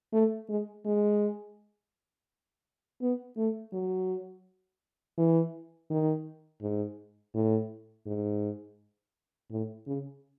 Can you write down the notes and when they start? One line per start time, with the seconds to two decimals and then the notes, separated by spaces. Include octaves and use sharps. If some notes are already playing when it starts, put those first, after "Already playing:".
0.13 A3
0.49 G#3
0.85 G#3
3.02 B3
3.37 A3
3.73 F#3
5.18 E3
5.90 D#3
6.62 G#2
7.35 A2
8.06 G#2
9.51 A2
9.87 C#3